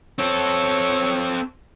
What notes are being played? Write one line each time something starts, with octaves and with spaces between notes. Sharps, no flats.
C4 A4 C#5